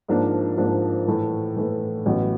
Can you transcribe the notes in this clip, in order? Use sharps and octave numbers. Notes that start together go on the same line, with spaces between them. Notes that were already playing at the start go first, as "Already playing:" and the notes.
G#2 F3 A#3 D4
G#2 F3 A#3 D4
A2 E3 A3
A2 E3 A3
A1 A2 F#3 B3